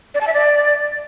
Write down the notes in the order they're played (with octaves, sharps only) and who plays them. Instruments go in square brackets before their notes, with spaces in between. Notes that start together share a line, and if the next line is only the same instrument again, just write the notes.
[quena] D5
A5
E5
D5